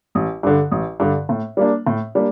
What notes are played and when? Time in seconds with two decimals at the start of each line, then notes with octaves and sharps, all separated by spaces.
0.15 A1
0.43 G2 D3
0.71 A1
1.00 G2 D3
1.29 A2
1.57 G3 A#3 D4
1.87 A2
2.15 G3 A#3 D4